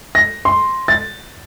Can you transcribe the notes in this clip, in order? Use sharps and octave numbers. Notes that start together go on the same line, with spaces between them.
A#6
C6
A6